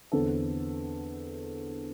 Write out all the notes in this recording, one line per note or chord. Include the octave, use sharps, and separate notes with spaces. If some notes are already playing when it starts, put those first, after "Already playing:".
E2 D3 C4 A4